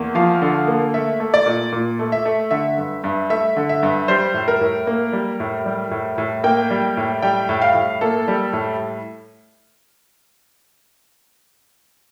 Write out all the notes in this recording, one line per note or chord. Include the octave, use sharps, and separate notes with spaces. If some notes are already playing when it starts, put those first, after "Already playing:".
Already playing: E2 A#3
F3 F5
D3
A#3
A3 E5
A3
D5
A#2
A#2
A3
E5
A3
D3 E5
G2
G2
A3 E5
D3
E5
G2
G3 C5
A2
A#4
A2
A#3
G3
A2
G3
A2
A2
A#3 G5
G3
A2
G3 G5
A2
F5
A2
A#3 A4
G3
A2